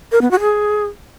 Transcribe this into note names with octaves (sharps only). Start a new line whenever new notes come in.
A#4
B3
F#4
G#4